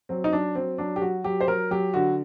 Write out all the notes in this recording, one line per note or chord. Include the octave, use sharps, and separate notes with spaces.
F#3 C4
D#4
F#3 D4
F#3 C4
F#3 D4
G4
F#3 F#4
F#3 G4
C5
F#3 A#4
F#3 G4
D3 F#4